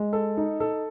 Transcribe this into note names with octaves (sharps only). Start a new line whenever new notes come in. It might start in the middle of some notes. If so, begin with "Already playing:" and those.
Already playing: G#3
A4
D#4
A4